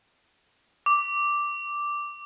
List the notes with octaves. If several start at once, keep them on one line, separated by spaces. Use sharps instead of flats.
D6